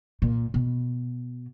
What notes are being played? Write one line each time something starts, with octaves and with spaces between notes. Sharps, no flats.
A#2
B2